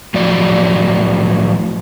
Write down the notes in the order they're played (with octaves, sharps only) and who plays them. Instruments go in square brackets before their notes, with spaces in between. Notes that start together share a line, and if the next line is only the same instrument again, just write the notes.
[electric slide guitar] A2 F3 F#3 D5